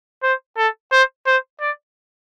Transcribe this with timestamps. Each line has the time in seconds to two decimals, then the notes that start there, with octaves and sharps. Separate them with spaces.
0.23 C5
0.57 A4
0.92 C5
1.26 C5
1.61 D5